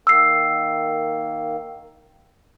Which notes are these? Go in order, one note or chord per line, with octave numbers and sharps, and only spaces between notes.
D#3 A#3 E6 C7